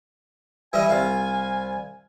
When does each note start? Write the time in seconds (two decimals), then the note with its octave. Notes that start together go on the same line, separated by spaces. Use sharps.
0.73 E3 G3 D#5 G#5
0.89 C2 F5